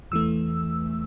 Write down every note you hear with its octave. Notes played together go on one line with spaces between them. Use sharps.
E2 E3 A3 E6